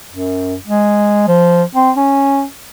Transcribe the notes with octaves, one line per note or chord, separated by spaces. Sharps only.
F#2
G#3
F3
C4
C#4